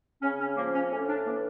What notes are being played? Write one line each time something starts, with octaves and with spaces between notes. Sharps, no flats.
C#3 C#4
C#4
F3 A#3
C#4
A2 C#4
D4
E3 A#3